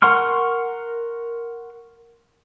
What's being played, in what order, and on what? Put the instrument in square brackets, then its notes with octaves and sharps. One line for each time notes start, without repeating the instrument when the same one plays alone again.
[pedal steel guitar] A#4 F#5 C6 C#6 F6